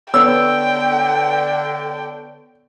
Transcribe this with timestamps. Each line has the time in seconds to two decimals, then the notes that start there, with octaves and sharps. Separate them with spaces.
0.14 D3 B3 C#5 G5 E6